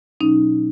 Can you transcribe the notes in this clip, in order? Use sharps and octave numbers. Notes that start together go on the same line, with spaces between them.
B2 F#3 C#4 D#4